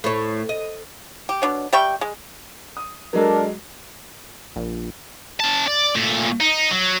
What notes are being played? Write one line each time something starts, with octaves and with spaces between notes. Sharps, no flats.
A2 C#5
D#5
G4
B2 D4 C#5
G3 E5 G5 C#6
G#3
D#6
F#3 G#3 D4 A4 A#4
A#1
C#4 A5
D5
A#2 A3
D#4
F#3